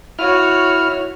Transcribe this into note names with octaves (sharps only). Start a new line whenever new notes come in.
E4 F#4 C#5 F6